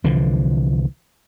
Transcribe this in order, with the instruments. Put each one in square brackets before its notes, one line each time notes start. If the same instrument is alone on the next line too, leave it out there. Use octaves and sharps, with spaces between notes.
[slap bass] C2 D3 E3 F3